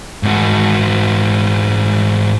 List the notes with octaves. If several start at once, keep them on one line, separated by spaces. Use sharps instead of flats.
G#2 F#4